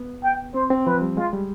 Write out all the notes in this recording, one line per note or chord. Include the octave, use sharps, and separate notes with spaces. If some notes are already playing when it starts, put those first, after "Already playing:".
Already playing: B3
G5
C4 C5
C4
F3 B4
G3
G#3 F4
G3